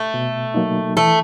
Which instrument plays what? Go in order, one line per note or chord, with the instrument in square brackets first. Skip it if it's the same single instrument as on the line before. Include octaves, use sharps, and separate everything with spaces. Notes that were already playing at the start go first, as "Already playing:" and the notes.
Already playing: [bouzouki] A3
[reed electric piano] B2
F#3 A#3 D#4
[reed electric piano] E3 [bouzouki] A3